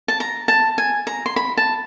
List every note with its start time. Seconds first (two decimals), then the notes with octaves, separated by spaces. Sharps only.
0.08 A5
0.20 A#5
0.48 A5
0.78 G#5
1.07 A#5
1.26 C6
1.36 B5
1.57 A5